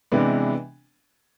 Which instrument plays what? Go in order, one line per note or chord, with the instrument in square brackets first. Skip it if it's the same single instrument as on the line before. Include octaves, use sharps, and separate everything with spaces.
[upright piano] C3 E3 G#3 B3 D4